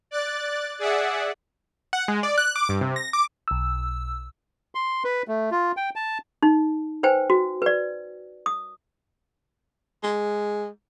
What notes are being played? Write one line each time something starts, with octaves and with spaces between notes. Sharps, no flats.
D5 F#6 A6
G#4 D5 E5 F#5
F#5
G#3
D5
F#6
D6
G2
C3
A#6
D6
B1 E6
C6
B4
A3
F4
G5
A5
D#4
B4 C5 G5 G#5
F#4
B4 D5
D#6
G#3